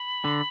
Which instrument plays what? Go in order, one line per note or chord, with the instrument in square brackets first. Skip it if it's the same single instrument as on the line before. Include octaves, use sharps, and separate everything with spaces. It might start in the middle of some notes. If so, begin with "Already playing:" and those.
Already playing: [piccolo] B5
[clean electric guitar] D3